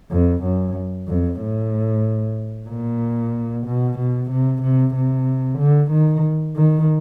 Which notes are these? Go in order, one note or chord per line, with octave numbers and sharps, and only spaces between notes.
F2
F#2
F2
A2
A#2
B2
B2
C3
C3
C3
D3
D#3
D#3